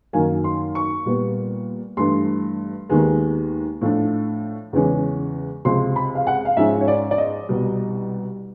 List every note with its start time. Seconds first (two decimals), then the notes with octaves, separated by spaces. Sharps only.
0.13 F#2 D#3 F#3 A#3 G#5
0.44 C6
0.75 C#6
1.06 A#2 G3 B3
1.97 G2 E3 A3 D4 C6
2.89 D#2 D#3 G#3 B3
3.81 A2 F3 A3 D4
4.73 E2 C#3 E3 G#3 C#4
5.65 C#2 C3 F3 C6
5.96 B5
6.15 F5
6.27 F#5
6.45 F5
6.57 G#2 F3 G#3 C#4 E5
6.81 C#5
6.88 D5
7.11 D5
7.18 D#5
7.49 C2 B2 G3